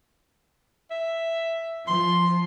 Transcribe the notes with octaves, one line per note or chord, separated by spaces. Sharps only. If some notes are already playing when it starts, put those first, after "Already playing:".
E5
F3 C6